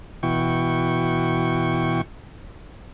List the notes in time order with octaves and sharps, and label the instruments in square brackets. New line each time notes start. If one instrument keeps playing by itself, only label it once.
[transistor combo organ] B2 E3 E4 F#4 G5 C#6